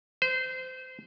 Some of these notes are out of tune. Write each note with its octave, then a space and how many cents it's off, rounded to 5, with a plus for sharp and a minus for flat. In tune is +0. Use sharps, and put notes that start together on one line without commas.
C5 -25